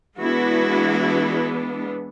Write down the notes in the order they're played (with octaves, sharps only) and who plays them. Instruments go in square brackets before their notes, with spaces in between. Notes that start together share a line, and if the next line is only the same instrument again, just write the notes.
[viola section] E3 G#3 B3 D4 E4 F#4